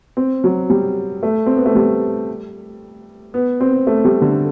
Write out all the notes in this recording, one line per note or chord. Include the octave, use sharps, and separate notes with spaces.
C4
F#3
G3
A3
C4
B3
A3
G3
B3
C4
A3
G3
D3